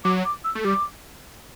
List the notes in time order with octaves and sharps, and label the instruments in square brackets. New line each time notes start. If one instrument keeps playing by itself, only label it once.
[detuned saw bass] F#3 [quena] D6
[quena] D6
E6
[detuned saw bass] A3
[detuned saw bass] G3 [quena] D6